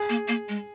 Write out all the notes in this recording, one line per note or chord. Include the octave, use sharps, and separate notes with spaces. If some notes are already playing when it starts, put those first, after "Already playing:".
Already playing: G#4
A#3
A#3
G#3